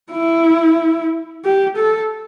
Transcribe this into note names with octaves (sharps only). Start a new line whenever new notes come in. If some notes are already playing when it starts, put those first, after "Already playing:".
E4
G4
A4